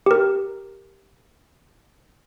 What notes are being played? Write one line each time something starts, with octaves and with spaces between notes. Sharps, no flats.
G4 A#4